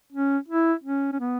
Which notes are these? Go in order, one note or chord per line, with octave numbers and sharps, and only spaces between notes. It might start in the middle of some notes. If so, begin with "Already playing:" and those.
C#4
E4
C#4
C#4
B3